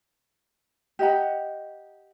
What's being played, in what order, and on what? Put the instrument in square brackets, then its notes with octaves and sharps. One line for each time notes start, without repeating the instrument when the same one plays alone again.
[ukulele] G4 D#5 F#5 A#5